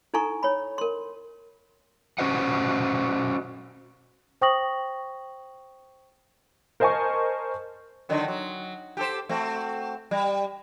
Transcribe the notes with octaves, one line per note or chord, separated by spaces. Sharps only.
D#4 E4 A4 G#5 A#5 C#6
C#5 B5
A#4 C6
C#4 F#4 C5 D#5 F#5
C5 G5 C#6 D#6 A#6 F#7
A#4 C5 D#5 G#5 A5 C#6
D3 D#3 F#3
F#3
G4 A4 C5
A3 C4 F#4
G3